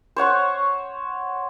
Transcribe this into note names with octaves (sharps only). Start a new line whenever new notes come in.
C5 C#5 F#5 C#6